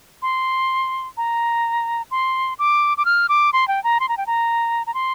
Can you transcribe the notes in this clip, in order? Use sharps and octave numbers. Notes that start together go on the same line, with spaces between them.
C6
A#5
C6
D6
D6
F6
D6
C6
G5
A#5
C6
A#5
G5
A#5
A#5
C6